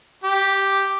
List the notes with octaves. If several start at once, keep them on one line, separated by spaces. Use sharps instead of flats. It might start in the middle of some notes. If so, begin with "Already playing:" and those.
G4